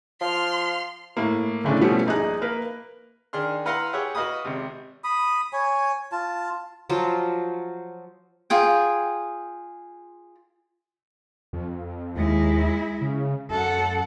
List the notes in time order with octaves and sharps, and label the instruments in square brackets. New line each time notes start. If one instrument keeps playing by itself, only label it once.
[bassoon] F3 [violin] C6 F6
[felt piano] A2 A#3
F#1 A2 C#3 D4
B2 F3 G3 A3 B3 C#4
A#1 D#4 G#4 F#6
A#3 A#4 B4
[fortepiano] D#3 D4 G#4 C6 F6
E4 B4 F5 F#5 A#5 C6
G4 G#4 C#5 E5 F#5
F#4 B4 D#5 F5 B5 D#6
G#1 C3
[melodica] B5 D#6
C#5 G#5
F4 A5
[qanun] F3 F#3 F4 C5
[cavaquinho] F4 G#4 G5
[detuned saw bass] F2
[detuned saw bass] D#2 [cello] G#3 E4
[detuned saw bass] C#3
[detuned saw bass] F#2 [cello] A4 F#5